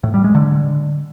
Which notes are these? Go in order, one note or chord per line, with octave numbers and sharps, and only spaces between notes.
A2
G3
G#3
D3